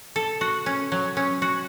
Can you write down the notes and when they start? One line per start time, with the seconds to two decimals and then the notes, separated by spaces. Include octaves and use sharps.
0.16 A4
0.41 F#4
0.66 C#4
0.92 F#3
1.17 C#4
1.42 F#4